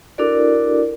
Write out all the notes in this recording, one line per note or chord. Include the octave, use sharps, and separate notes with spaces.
D4 E4 F#4 A4 A#4 D5